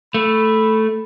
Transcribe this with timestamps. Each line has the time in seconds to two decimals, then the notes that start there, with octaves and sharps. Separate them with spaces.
0.14 A3 B5